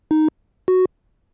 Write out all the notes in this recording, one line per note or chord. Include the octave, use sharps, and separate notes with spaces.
D#4
F#4